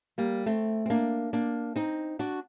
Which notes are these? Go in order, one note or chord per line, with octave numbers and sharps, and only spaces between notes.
G3 A#3
A3 C4
C4
A#3 D4
A#3 D4
C4 D#4
D4 F#4